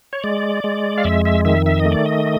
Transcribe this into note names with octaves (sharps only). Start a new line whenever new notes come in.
C#5
G#3 D5
G#3
F5
F2 E5
E5
D#3 E5
E5
D#5
A3
D5
D#5